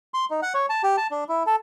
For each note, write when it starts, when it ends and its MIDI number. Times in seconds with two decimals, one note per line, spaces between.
0.14 0.25 84
0.30 0.40 63
0.42 0.53 78
0.54 0.66 73
0.69 0.82 81
0.83 0.96 67
0.97 1.07 81
1.11 1.24 62
1.29 1.43 64
1.46 1.56 69